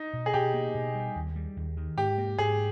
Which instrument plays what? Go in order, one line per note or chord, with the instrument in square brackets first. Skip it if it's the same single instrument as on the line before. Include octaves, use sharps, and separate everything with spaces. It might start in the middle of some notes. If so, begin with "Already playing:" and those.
Already playing: [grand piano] D#4
[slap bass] B2
[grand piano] G#4
[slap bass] B2 [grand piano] G4
[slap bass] A#3
B2
G3
D#2
G3
D#2
D#3
[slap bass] G#2 [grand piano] G4
[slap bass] A#3
[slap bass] G#2 [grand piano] G#4